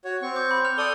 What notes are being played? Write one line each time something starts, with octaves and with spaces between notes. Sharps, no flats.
F#4 C#5
C4 C#6
D6 G6
B5
F6 F7
A4 D5 D#6 G7